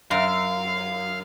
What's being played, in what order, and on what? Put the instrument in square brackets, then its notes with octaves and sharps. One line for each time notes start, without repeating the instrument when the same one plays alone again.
[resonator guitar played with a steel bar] F#2 [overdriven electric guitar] F5